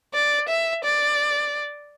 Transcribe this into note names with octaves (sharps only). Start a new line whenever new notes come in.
D5
E5
D5